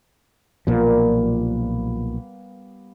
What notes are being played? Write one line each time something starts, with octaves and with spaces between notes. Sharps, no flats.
B1 A#2 F3 G3 A#3 B3